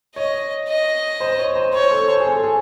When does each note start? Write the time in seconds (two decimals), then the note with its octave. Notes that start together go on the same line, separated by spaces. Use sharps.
0.16 C#5 D#5
0.68 D#5
1.20 C5
1.39 C#5
1.56 C5
1.73 C5 C#5
1.91 A4
2.08 C5
2.20 G#4
2.27 A4
2.43 G#4